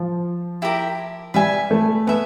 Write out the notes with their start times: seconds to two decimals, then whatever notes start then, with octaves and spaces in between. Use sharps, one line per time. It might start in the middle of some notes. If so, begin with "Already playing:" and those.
Already playing: F3
0.62 E4 G4 A#4
1.34 G3 B4 E5 G#5
1.71 A3
2.07 B3 E5 G#5